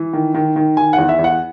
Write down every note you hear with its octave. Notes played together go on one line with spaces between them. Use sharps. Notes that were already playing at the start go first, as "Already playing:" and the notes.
Already playing: E3
D#3
D#3
D#3
D#3 G#5
E2 F#5
E5
E2
F#5